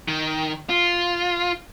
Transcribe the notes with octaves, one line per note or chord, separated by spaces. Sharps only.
D#3
F4